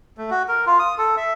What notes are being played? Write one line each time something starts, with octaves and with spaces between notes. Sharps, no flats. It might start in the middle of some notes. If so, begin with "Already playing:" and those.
A3
F#4
A#4
F4
D#6
A4
E5